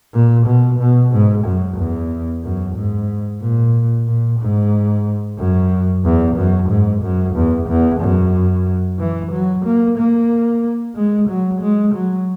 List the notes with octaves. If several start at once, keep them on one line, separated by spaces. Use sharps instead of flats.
A#2
B2
B2
G#2
F#2
E2
F#2
G#2
A#2
A#2
G#2
F#2
E2
F#2
G#2
F#2
E2
E2
F#2
E3
F#3
A#3
A#3
G#3
F#3
G#3
F#3